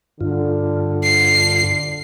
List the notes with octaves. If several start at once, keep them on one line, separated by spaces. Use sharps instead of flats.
G2 D3 F4
C7